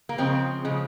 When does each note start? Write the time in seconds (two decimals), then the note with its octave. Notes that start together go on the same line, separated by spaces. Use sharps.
0.09 A#3
0.18 C#3 F3 G#3 C4
0.65 C#3 F3 G#3